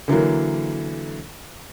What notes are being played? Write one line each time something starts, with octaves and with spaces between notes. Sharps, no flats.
D3 E3 F#3 A#3